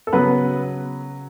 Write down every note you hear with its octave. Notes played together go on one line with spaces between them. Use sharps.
A4
C#3 F#3 B3 B4